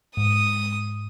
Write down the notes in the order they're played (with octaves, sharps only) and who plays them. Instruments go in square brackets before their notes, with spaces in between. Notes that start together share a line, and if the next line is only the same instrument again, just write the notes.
[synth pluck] G#2 [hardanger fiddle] D#6